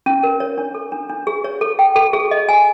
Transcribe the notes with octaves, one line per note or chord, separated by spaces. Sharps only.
C#4
A#4
C#5
D4
A4
D4
D4
G#4
C#5
A4
G5
A4
G#4
D#5
G#5